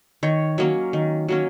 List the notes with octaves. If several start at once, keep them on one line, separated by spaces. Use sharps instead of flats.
D#3 C#5
F#3 A#3 C#4
D#3
F#3 A#3 C#4